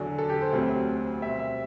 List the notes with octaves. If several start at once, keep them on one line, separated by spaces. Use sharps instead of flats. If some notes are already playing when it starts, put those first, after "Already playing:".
Already playing: E2 D3 F#3 D5
A4
G4
C5
D2 C3 F#3 C4
B2 G3 C4 E5
E5